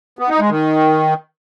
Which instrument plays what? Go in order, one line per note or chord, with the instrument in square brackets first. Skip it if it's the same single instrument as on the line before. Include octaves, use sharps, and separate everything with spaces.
[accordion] B3
D#4
G#3
D#3